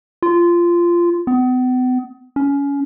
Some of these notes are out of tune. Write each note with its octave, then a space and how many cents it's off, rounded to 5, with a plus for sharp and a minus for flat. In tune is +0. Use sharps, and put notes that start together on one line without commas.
F4 -15
B3 +40
C#4 +25